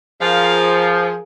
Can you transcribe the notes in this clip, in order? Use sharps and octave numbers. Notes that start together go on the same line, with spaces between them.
F3 G#4 A#4 F5